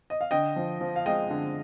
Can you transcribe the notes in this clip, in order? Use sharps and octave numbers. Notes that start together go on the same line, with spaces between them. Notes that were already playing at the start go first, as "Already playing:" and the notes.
D#5
F5
D3 D#5 G5
F3
F3
F5
G#3 D#5 G5
D3